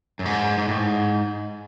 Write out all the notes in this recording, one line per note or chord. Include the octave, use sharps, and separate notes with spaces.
F#2
G#2
G#2
A2
G#2